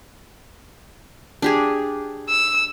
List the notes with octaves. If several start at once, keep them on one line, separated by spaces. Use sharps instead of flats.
D4 G4 G#4
E6